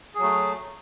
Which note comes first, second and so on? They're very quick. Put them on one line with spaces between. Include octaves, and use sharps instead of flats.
G#4 F#3 A3